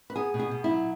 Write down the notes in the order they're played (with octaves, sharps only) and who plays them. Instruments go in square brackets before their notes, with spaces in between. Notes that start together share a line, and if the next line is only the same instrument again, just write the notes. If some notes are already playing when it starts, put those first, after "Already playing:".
[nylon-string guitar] B4
B3 G#4
B2
G#4
B2
E4
F#3